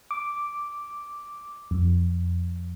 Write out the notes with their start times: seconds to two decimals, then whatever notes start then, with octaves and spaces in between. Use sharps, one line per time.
0.11 D6
1.71 F2